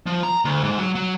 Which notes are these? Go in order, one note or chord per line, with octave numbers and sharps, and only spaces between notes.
F3
A#5
D2
G#2
F#3
F#3